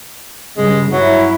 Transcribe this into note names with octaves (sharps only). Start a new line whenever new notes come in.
G2 C#3 G#3
F#3 E4